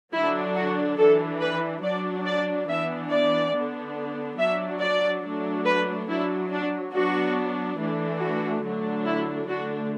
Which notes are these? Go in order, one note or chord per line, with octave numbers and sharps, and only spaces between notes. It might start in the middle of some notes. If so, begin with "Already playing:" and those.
D3 F#3 D4 E4
F#4
E3 D4 A4
B4
F#3 D4 D5
D5
E3 B3 D4 E5
D5
D3 B3 D4
F#3 D4 E5
D5
F#3 A3 D4
B4
F#3 D4 E4
D4
F#3 B3 D4 F#4
E3 A3 D4
F#4
D3 F#3 A3 D4
E4
D3 A3 D4 F#4